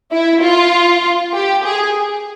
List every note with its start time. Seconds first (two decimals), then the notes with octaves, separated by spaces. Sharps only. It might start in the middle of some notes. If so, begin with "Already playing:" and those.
0.12 E4
0.42 F4
1.34 G4
1.64 G#4